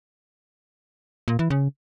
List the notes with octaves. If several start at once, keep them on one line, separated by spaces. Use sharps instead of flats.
A#2
E3
C#3